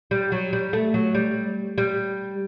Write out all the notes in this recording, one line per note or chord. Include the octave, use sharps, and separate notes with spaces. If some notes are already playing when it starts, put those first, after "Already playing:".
G3
F#3
G3
A3
F#3
G3
G3